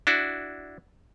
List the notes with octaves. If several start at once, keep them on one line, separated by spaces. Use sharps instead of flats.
D4 E4 F#4